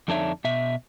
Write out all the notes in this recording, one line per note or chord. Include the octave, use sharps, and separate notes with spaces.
F2 D3 D4 D#4 C#5 E5
B2 E5